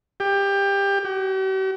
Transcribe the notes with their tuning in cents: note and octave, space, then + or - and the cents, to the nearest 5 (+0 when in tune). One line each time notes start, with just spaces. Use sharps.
G4 +20
G4 -45